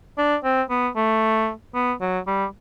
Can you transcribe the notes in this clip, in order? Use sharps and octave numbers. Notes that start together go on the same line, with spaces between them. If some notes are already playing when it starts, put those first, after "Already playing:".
D4
C4
B3
A3
B3
F#3
G3